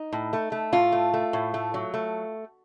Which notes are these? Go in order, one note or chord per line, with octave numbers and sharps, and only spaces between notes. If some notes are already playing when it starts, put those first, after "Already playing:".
Already playing: D#4
A2
A3
A3
A2 F4
A3
A3
A2
A3
F#3
A3